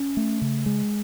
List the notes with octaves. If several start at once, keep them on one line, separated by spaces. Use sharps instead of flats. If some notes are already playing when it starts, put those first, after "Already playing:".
Already playing: C#4
A3
C#3
G#3